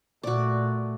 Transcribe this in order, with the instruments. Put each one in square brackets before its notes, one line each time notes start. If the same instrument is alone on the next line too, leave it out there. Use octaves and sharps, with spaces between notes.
[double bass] A#2 A3 [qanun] F#4 D5